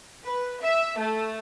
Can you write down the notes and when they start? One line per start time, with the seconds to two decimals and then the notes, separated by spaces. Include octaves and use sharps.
0.24 B4
0.62 E5
0.97 A3